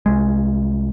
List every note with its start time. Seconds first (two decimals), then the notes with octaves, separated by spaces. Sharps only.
0.06 C2 G#3